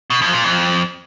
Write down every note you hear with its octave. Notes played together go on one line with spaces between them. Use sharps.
B2
F2
A#2
F2